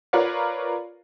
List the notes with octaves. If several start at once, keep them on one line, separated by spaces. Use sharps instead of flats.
F4 A#4 B4 C#5 D5 F5